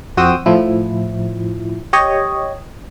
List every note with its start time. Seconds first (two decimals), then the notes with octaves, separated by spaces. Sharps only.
0.17 F2 F#4 C5 G5 D#6 E6
0.46 A2 F3 E4
1.93 G4 C#5 D#5